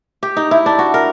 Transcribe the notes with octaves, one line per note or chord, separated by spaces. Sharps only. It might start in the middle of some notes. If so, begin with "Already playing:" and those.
G4
D#4
E4
D4
F#4
A#4